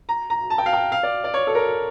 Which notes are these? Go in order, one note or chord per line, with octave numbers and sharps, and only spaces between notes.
A#5
A#5
A5
G5
F5
G5
F5
D5
D5
C#5
A4
A#4